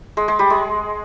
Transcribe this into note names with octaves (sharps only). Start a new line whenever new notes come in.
G#3
G#3
G3
G#3